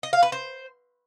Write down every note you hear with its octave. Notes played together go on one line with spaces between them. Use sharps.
D#5
F5
B4
C5